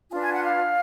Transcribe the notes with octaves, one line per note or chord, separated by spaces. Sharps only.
D4 F4 B4 G#5
G#5
F#5
F5